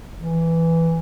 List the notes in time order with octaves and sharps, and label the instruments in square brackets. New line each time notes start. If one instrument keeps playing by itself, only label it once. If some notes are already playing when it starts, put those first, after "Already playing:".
[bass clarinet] E3